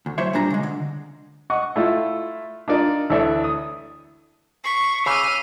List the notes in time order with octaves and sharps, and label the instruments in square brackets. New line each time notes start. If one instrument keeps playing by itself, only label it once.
[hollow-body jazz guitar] D2
F#2 F#3 E4 C5 C#5 E5
A#2 G3 D4 A#5
C#3 G#3
D3
[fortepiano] D#5 F#5 C#6
A3 E4 F4 A4
D4 D#4 F4 A#4 D5
D2 E3 A4 C#5 D5 E5
D#6
[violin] C#6 [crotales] B6 C7
[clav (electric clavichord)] C#3 [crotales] D6 E6 C7 [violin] F6 D#7